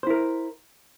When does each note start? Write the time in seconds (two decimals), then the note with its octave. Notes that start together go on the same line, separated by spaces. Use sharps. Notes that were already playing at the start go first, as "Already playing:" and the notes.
0.03 C5
0.07 E4
0.10 A#4